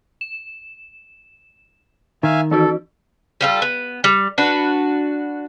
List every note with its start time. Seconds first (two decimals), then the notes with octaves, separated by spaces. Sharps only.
0.21 E7
2.23 D#3 E5 F5 G#5
2.51 E3 D#4 F#4 A4
3.41 G3 F4 A4
3.62 B3
4.04 G3
4.38 D4 F#4 B4